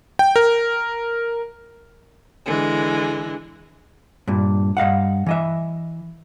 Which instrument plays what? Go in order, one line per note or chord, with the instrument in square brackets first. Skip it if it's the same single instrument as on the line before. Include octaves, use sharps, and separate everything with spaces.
[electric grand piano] G5
A#4
[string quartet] D3 E3 G#3
[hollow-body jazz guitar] G2 A#2
G2 D#5 F5 F#5
E3 D#5 E5